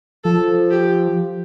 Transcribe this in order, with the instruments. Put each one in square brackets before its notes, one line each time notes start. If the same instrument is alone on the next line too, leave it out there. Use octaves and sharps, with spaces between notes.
[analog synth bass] F3 [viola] A4
[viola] G4